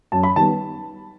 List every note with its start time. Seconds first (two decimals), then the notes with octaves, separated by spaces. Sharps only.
0.12 F#2 A5
0.23 B5
0.36 D#3 G3 B3 A5